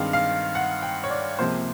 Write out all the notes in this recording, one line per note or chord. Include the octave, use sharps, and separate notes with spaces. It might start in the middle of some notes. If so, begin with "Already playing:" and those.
Already playing: G2 D#3 G#3 C4 F5
F5
F#5
G5
C#5
D5
C#2 C3 F3 A#3 C5